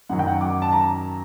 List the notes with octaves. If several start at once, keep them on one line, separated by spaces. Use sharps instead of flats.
F#2 D#3 F#3 F#5
G5
F#5
D6
A5
A#5